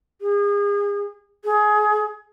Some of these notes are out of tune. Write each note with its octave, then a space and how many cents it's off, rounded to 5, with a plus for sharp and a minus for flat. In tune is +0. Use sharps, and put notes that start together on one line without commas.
G#4 -35
G#4 +20